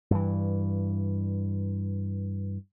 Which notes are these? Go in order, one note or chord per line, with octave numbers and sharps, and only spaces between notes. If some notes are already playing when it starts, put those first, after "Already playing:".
G2 E3